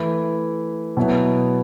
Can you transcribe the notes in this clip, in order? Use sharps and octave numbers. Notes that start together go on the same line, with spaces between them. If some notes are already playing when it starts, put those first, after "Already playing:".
Already playing: E3 A3 E4
B2 F#3 B3 E4